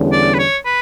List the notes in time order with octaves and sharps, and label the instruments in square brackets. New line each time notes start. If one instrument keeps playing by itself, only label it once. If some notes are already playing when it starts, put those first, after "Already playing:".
Already playing: [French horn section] E2 D3 G3 C#4
[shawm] D5
B4
C#5
B4